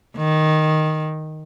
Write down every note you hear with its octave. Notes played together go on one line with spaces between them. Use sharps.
D#3